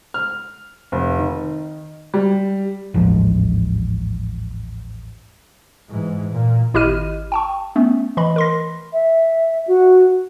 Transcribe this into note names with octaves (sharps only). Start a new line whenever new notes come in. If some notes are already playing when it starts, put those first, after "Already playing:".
F6
F1
D#3
G3
A1 D#2 G#2 F3
G#2 E3
A#2
G#1 E4 G4 D#5 F6 D#7
G5 A5 C#6
A3 B3 C#4
E3 D#5 B5
A#4 C6 A#6
E5
F#4